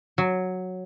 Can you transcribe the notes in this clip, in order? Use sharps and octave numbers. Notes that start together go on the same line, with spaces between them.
F#3